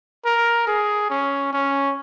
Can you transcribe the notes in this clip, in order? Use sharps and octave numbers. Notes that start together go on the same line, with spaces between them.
A#4
G#4
C#4
C#4